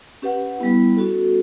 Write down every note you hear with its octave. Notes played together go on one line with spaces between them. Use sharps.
C#4 G4 B4 F#5
G3 B3 E4
C#4 F#4 A4